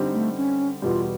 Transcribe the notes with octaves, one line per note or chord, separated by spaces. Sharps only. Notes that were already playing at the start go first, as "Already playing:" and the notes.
Already playing: D3 G3 C4 D#4
A3
C#4
E2 B2 G3 F4